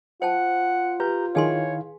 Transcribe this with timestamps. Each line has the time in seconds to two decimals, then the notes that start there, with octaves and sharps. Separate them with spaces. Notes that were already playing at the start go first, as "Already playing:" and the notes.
0.22 F4 C5 F#5 G5 A5
1.00 G4 B4 A#5 G6
1.35 D#3 E4 G#4 C#5 F5 G#5 C6